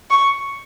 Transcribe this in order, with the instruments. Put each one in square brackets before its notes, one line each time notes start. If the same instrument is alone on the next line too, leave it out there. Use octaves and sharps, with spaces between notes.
[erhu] C#6